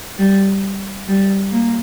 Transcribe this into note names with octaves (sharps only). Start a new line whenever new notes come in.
G3
G3
A#3